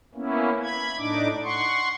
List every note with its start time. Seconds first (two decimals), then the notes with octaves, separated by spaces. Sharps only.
0.15 A#3 B3 C#4 E4
0.62 B5 G#6
0.98 A2 D4 D#4 D6
1.44 F#5 C6 C#6